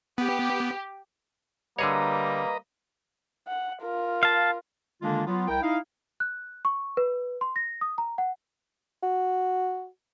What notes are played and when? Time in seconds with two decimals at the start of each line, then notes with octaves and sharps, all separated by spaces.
0.18 B3 G4
1.79 D3 G3 A#3 G#4 B4 C#5 D#5 A#5
3.48 F#5
3.83 F4 A#4
4.23 F5 A5
5.02 D3 D#3 G#3 A#3 D4 F4
5.26 F#3 B3 F4
5.48 C2 E4 A#4 G5
5.61 D#4 E4 F5
6.20 F#6
6.65 C#6
6.97 B4
7.41 C6
7.56 A#6
7.81 D#6
7.98 A#5
8.18 F#5
9.03 F#4